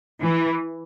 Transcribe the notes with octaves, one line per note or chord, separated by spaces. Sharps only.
E3